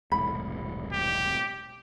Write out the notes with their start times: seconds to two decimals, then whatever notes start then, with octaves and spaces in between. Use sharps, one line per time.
0.12 E1 C2 A2 B5
0.93 G4